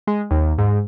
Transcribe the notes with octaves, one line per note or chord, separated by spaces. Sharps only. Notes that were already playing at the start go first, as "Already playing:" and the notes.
G#3
D#2
G#2